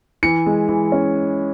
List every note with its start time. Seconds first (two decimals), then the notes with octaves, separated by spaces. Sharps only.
0.23 E3 C#7
0.46 G#3
0.69 E3
0.92 C#4